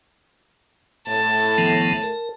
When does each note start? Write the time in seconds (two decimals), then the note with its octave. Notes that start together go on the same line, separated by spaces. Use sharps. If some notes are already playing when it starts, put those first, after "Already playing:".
1.08 A2 A5
1.58 D#3 F3 B3
2.04 A#4